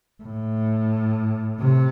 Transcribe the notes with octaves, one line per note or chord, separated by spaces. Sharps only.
A2
C3